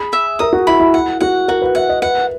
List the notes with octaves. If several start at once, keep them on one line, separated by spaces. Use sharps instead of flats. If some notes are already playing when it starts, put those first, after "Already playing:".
Already playing: G#4 B5
E5
A#4 D#6
F#4
E4 B5
E4
F#5
F#4 F#5
F#4 A#4
B4
E5 F#5
D#5
B4 F#5